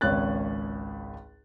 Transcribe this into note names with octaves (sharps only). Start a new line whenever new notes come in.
G#1 C#2 C#4 F#6 A6